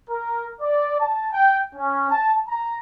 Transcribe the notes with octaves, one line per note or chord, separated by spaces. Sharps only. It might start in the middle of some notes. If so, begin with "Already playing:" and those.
A#4
D5
A5
G5
C#4
A5
A#5